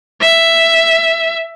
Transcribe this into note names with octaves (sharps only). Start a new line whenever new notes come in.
E5